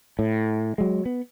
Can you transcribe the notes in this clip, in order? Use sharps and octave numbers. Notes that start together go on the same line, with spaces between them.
A2
F#3 G#3
B3